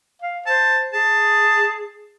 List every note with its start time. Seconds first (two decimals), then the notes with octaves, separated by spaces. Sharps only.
0.22 F5
0.46 C5 A5
0.93 G#4 A5